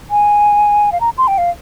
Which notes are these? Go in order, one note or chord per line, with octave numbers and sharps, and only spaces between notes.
G#5
F5
A#5
C6
G5
F5